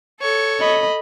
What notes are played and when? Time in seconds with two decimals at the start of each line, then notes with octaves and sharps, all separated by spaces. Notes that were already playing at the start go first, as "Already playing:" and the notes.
0.20 A4 C#5
0.60 D#5 B5